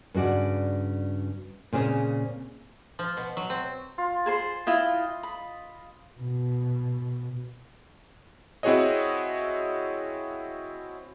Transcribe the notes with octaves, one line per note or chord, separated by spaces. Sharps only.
G2 C#3 F#4 D5
A#2 C#3 C4 G#4 C#5
F3
B2
F#3
C4
F4
G#4 C5 C6
E4 F4 D#5 G5
B5
B2
C4 E4 F#4 G#4 C#5 D#5